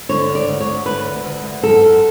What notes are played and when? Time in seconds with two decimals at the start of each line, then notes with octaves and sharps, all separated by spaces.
0.09 D3 C#5
0.28 D2
0.35 D5
0.48 D2
0.60 C#5
0.67 D2
0.86 D3 B4
1.05 D2
1.25 D2
1.44 D2
1.63 F#2 A4
1.82 F#2